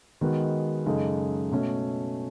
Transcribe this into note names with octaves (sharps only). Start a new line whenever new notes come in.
D#3 G#3 B3 F#4
F#2 C#3 G#3 D#4 A4
B2 A3 C#4